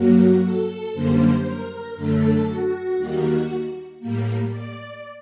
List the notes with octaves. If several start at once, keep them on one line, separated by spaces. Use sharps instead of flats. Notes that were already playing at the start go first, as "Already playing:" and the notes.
Already playing: G2 F#3 A#3 F#4
A4
F#2 D3 G3 A#3 C5
A#4
F#2 D3 A3 A4
F#4
D#2 D#3 G3 A#3
A2 G3 A#3
D5